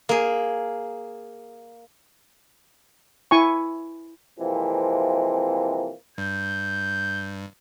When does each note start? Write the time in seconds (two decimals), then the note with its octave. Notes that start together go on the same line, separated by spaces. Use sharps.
0.09 A#3 G#4
3.31 E4 G#5 C#6
4.39 C3 E3 F3 G#3 A#3 C4
6.18 G2 G6